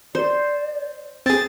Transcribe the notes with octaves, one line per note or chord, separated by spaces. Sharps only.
C5 D5
C4 G#4 A6